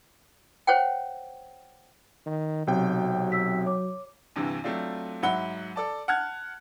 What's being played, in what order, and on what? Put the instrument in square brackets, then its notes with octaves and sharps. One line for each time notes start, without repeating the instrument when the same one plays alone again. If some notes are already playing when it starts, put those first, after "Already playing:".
[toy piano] C5 C#5 F#5 G5
[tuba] D#3
[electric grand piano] B1 C3 G5 [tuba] F#3
[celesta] E6 B6
C#5 D6
[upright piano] D2 G2 C3 E3
F#3 A3 C4 D4 F4
G#2 F#3 E5 F#5 B5 G7
A4 D5 A5
F#5 A5 F6 F#6 G#6